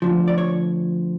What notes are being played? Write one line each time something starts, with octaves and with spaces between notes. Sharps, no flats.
D2 D3 F3
D5
C#5